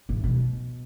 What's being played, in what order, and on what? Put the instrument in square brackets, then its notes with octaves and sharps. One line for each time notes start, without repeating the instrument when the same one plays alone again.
[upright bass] A2
B2